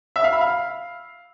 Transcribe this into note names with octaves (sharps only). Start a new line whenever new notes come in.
E5
F5
B5
F5